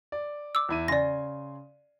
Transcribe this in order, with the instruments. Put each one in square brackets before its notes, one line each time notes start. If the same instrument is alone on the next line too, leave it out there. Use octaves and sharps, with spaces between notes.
[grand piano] D5
[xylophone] D6 E6
[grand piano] E2 E4 D#7
[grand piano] C#3 G#5 C6 [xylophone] D5 A#6